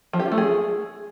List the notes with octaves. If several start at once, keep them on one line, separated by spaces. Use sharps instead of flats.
F3
G4
F4
A3
G#4